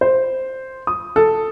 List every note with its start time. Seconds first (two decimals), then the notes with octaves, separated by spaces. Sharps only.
0.01 C5
0.87 D#6
1.16 A4